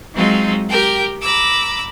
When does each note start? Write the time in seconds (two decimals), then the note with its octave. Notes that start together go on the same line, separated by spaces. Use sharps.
0.13 F#3 G#3 C4 D#4 F4
0.68 G4 A#4 G5
1.20 A#5 B5 D6 E6